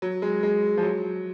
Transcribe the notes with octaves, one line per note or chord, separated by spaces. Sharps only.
F#3
G#3
G#3
F3
F#3